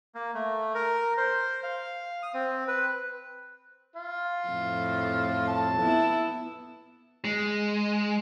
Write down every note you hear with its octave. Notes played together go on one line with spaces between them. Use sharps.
A#3
A3
A#4
C5
F5
D#6
C4
B4
F4
F2 A2
A5
B3 E4
G#3